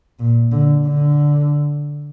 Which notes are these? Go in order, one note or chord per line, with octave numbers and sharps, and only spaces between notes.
A#2
D3
D3